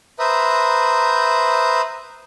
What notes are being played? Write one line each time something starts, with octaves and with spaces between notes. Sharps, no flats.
B4 C5 E5 A#5 D#6